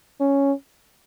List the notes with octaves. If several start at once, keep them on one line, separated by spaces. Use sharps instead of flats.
C#4